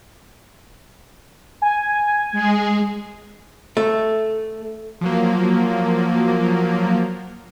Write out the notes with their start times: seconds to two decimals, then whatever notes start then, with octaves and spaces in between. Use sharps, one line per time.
1.62 G#5
2.32 G#3 G#4
3.77 A3
5.01 F3 F#3 A#3